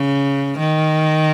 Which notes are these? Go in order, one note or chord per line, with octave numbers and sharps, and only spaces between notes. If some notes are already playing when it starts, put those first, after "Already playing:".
Already playing: C#3
D#3